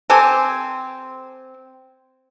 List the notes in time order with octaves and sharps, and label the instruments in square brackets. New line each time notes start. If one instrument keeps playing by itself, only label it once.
[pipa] C4 G4 A4 G#5